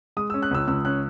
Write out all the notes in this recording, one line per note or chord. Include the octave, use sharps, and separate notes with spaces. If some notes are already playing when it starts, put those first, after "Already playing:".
G#3 D#6
E6
C#4
F#6
C#2 E6
C#2 E6
C#4 F#6